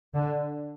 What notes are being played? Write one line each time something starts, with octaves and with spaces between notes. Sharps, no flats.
D3